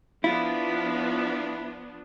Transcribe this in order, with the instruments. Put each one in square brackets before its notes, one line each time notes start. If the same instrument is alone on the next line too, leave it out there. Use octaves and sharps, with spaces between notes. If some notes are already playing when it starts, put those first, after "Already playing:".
[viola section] F3 B3 D4 [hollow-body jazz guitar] E4 F4